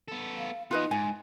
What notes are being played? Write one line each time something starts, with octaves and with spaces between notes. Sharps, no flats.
B3 A4
F5
B3 D#4 F4 G#4 B4 D#5
G#2 G#5